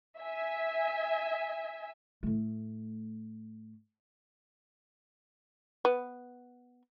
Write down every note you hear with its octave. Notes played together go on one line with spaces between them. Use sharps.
E5 G#5
A2 A3
B3